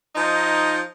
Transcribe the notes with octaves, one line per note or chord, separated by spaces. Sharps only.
F3 D#4